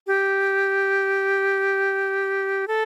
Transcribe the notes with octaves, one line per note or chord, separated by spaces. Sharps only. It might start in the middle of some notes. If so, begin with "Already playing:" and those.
G4
A4